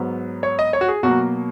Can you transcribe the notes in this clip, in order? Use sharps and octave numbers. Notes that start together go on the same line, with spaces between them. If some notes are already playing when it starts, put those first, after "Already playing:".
Already playing: G#2 F#3 B3
C#5
D#5
C#5
F#4
G#4
B2 F#3 A#3 F#4